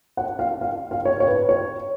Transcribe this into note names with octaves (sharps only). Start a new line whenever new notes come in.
F#5
F5
F5
F5
C#5
C#5
B4
C#5